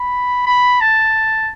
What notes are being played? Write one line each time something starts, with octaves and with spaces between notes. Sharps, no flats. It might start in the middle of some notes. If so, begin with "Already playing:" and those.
Already playing: B5
B5
A5